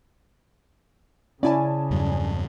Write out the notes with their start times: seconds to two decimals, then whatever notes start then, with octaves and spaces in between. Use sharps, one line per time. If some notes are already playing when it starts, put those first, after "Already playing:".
1.43 C#3 C#4 E4 D5 G#5 A5
1.91 E2 G2 F#3